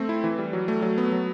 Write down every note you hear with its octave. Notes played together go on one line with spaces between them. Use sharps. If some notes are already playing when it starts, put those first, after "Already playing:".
Already playing: A3 C4
E4
E3
G3
F#3
A3
F#3
B3
F#3